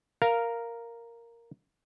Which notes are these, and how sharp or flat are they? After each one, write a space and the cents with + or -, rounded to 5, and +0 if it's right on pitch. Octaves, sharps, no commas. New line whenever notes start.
A#4 +0 F5 -5